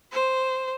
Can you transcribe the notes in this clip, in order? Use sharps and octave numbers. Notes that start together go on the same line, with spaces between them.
C5